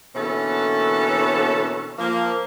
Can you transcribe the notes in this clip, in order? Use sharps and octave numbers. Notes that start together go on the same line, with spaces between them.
B2 D3 E3 A#3 C#4 A4
F3 A#3